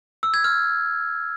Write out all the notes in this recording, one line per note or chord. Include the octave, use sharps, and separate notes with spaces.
E6
G#6
F6